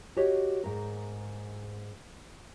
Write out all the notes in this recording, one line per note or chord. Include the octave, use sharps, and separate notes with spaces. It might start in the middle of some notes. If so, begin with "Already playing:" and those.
F#4 G4 C#5 D#5
G#2 A#4